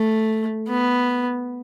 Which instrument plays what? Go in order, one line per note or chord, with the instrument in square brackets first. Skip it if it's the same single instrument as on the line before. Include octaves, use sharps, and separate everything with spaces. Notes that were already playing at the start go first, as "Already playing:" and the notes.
Already playing: [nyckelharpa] A3
B3